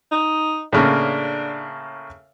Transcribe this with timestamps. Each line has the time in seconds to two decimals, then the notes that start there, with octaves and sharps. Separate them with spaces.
0.11 D#4
0.73 A2 C#3 A#3 D4